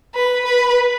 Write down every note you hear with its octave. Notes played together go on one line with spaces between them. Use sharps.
B4
B4